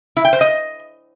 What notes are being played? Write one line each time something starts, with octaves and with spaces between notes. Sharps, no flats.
E4
G5
C5
D#5